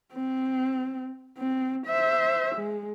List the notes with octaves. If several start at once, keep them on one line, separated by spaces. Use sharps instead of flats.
C4
C4
C5 E5
G#3